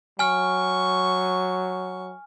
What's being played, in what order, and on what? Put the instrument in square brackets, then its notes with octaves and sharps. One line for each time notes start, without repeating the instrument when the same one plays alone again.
[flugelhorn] F#3 [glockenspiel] G#5 F6 [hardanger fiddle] C#6